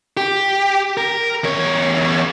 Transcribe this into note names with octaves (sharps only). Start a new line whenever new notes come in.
G4
A#4
E2 C#5